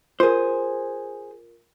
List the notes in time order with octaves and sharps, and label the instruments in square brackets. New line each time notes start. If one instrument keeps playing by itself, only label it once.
[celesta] F4 A#4 [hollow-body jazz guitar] G#4 C5